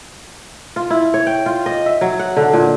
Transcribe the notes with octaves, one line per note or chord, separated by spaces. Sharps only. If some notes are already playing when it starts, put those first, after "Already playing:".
F4
E4
C#5
G5
F4
D#5
E5
F#3
F#5
D3
A#2